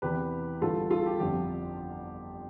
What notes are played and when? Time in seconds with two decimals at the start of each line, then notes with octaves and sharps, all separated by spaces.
0.02 E2 C3 E3 G4 B4
0.61 A1 G2 D3 G3 B3 F4 A4
0.90 F4 A4
1.01 A4
1.06 G4
1.20 G1 F2 D3 F3 G4